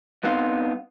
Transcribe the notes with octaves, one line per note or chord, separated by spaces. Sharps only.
G2 B3 C4 D#4 F5 C6